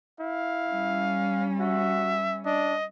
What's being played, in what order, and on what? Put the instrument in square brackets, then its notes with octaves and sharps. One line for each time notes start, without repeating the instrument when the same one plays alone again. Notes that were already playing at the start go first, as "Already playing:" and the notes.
[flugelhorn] E4 [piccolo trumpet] F5
[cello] G3 C#4
[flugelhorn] F#4 [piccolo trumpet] E5
[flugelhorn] D4 [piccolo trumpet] D#5